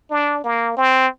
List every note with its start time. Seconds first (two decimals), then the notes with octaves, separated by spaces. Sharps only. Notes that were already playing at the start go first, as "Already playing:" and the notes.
0.11 D4
0.44 A#3
0.77 C4